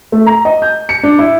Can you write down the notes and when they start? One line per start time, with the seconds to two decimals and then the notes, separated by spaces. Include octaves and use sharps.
0.12 A3
0.26 A#5
0.45 D#5
0.62 G6
0.89 C#7
1.03 D4
1.19 E4